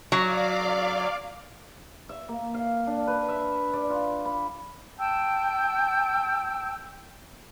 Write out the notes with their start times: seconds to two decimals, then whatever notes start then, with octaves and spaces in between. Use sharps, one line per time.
0.12 F#3 D5 F5 D6
2.09 E5
2.29 A#3
2.54 F5
2.87 D4
3.07 B4
3.29 E5
3.73 D5
3.90 F4
4.25 B5
4.98 G5 A5 E6 G6